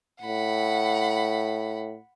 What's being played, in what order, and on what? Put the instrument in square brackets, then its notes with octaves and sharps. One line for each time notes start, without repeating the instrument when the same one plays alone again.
[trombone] A2 [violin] F#5 B5